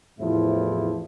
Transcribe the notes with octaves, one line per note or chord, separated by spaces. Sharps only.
E2 A2 C3 F3 E4